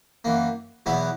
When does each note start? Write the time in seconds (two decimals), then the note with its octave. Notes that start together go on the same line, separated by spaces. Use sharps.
0.24 F#2 E3 A#3
0.86 E2 B2 F#3 B3 E4